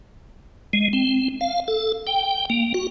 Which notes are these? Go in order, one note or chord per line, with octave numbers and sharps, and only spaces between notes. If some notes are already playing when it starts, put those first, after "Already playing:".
G#3
C4
F5
A4
G5
A#3
F#4